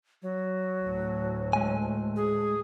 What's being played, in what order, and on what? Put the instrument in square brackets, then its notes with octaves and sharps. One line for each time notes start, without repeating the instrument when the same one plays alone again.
[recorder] F#3
[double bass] D2 A2
[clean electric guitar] G#3 G#5
[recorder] G#4